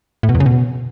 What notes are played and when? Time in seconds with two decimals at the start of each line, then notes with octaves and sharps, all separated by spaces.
0.23 A2
0.29 B2
0.35 E2
0.40 C#3
0.46 B2